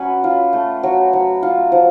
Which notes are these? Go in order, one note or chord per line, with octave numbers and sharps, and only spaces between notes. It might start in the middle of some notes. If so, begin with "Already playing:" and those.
Already playing: F#3 C#4 B4
F4
A3
F#3
F#3
F4
F3